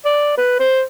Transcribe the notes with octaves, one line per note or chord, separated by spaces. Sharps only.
D5
B4
C5